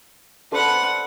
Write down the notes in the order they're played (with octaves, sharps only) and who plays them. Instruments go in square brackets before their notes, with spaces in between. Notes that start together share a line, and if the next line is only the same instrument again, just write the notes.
[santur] D4 A4 C5 [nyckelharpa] B4 F#5